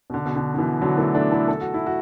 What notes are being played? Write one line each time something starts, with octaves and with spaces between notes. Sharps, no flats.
B2
D3
B2
D3
D3
B2 E3
D3 F#3
E3 A3
A3 D4
E4 A4
A4
F#4
E4
F#4